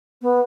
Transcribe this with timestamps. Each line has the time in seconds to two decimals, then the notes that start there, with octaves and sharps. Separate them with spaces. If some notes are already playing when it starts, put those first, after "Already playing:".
0.22 B3